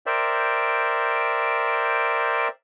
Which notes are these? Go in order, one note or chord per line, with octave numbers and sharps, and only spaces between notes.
A#4 C5 D5 E5 G5